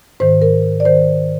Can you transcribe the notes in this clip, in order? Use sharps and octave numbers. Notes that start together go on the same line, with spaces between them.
G#2 D#3 C5
A#4
D5
D#3 C5